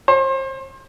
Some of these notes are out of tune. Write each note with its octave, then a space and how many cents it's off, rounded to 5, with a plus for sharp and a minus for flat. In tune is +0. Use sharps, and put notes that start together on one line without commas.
C5 +35